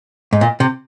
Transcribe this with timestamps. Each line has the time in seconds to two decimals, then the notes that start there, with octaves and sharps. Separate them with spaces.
0.33 G#2
0.41 A#2
0.60 C3